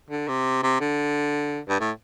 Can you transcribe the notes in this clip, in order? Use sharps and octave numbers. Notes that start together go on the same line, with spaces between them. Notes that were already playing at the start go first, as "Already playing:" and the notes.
D3
C3
C3
D3
G2
A2